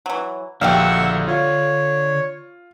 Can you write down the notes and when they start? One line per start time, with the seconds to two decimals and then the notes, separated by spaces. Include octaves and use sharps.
0.06 E3 F#3
0.61 A#1 D3 F#4 G4 D#5 F5 F#5 E6
1.27 F4 C#5